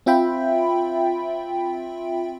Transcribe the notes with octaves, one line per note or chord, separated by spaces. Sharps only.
C4 F4 E5 G5 B5